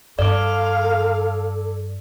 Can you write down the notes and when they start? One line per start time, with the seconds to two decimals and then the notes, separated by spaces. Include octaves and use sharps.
0.19 G2 A4 D5 F5 D6